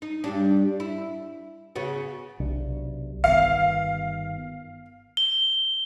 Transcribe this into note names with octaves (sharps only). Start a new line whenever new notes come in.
D#4
G2 G3 D4
E4
C#3 B3 F#4
B1 C3 D4
G1 D#3 B3 F5
G7